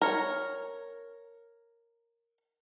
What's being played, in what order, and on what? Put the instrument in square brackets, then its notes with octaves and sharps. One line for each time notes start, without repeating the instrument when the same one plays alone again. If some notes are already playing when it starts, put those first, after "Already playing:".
[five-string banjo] A#4 C#5